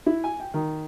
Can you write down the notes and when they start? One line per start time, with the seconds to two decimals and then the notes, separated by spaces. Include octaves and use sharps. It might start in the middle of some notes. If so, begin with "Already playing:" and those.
0.06 E4
0.24 G#5
0.40 G5
0.54 D#3